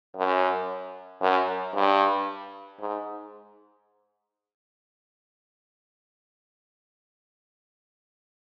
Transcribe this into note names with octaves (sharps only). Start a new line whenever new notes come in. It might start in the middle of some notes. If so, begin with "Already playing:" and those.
F#2
F#2
G2
G#2